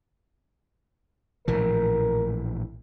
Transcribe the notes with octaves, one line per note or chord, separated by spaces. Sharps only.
A#1 A2 E3 A#4